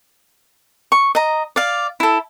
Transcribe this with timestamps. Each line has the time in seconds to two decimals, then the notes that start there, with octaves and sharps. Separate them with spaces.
0.92 C#6
1.15 D#5 A#5
1.56 D5 F5
2.00 E4 A4